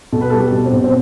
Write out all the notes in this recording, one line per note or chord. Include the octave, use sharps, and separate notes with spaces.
B2 A4
B4
G3 A4
G4
B2
C4
B2
C4